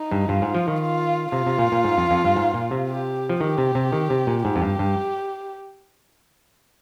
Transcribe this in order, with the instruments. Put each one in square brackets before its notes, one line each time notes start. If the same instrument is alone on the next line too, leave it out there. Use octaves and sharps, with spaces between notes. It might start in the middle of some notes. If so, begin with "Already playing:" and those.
Already playing: [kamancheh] D#4
[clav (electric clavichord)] G2
[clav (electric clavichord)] G2 [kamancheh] F4
[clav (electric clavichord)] G#2
F3
D#3
[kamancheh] F4
[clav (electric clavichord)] C3 [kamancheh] F4
[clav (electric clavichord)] C3
A#2
A#2
G#2
F2
F2
G2
G#2
A#2
C3
[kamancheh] G4
[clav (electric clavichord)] F3
[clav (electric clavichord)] D#3 [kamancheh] G4
[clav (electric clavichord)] C3
C3
D#3
C3
A#2
[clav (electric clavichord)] G#2 [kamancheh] G4
[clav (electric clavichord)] F2
G2
G2